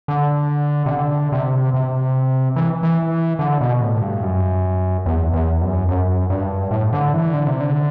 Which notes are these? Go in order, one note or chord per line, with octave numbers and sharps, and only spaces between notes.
D3
C3
D3
C3
C3
E3
E3
D3
B2
A2
G2
F#2
E2
E2
F#2
F#2
G2
A2
D3
E3
D3
C3
D3